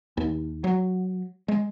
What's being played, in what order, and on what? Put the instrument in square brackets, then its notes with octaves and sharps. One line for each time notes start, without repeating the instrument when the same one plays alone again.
[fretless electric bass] D#2
F#3
G#3